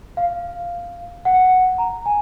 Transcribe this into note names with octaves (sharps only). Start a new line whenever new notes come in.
F5
F#5
A#5
G#5